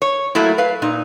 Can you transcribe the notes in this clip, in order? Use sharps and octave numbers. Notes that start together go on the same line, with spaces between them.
C#5
F#3 A3 A#3 E4
B4 F5
A#2 D#4